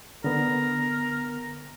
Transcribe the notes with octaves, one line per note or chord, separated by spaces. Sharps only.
D3 B3 A#4